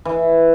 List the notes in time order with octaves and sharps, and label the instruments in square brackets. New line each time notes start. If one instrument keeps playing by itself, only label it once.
[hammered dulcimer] E3